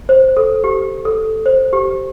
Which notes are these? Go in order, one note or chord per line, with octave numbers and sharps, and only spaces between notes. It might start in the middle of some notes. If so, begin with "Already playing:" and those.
C5
A4
G4
A4
C5
G4